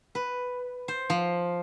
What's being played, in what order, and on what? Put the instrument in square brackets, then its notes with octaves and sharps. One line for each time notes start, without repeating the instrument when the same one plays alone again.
[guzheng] B4
C5
F3